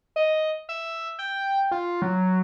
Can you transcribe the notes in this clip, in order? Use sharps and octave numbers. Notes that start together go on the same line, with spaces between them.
D#5
E5
G5
F4
F#3